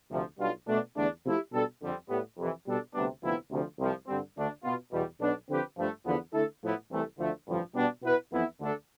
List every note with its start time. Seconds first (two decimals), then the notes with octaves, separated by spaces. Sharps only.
0.11 D2 C3 F3
0.39 B1 B2 G3 D4 F4
0.68 B2 A3 D4
0.96 E2 D3 A3 D4
1.24 C3 F3 A3 E4 G4
1.52 B2 G3 D4 A4
1.81 F2 D3 G3 C4
2.09 A2 G3 B3
2.38 F2 C3 E3
2.66 B2 G3 D4 A4
2.94 D2 C3 G3 B3 D4
3.22 D2 C3 F3 B3 E4
3.51 D2 C3 F3
3.79 C2 C3 F3
4.07 G2 D3 G3 C4
4.36 D2 D3 A3 D4
4.64 B2 B3 F4
4.92 E2 B2 G3
5.20 B1 B2 B3 D4
5.48 D3 F3 C4 G4 B4
5.77 G2 F3 A3
6.05 E2 D3 F3 B3
6.33 D3 A3 E4 A4
6.62 A2 F3 B3 E4
6.90 C2 C3 E3 A3
7.19 D2 D3 F3 A3
7.47 A1 G2 D3 F3
7.75 B2 G3 B3 D4
8.03 B2 B3 E4 B4
8.31 F2 E3 B3 E4
8.59 D2 D3 A3 D4 A4